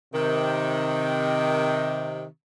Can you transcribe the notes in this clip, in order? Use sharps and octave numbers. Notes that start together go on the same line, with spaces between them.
C3 D#3